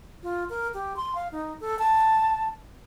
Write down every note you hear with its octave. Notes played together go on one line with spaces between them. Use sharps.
F4
A#4
G4
C6
F5
D#4
A4
A5